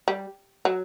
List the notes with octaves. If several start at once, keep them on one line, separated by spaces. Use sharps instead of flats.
G3
F#3